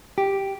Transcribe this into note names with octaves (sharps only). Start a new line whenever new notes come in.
G4